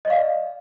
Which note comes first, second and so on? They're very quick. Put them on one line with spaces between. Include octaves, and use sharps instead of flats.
D#5 D5 F5